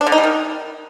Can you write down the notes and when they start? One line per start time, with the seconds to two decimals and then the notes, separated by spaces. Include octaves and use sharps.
0.01 D4
0.07 D3
0.12 D#4
0.18 G3
0.24 D#3